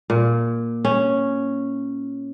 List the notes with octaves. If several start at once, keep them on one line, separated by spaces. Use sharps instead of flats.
A#2
C#4